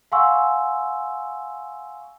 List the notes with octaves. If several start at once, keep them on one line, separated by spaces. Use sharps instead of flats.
F5 F#5 G#5 C6 C#6 E6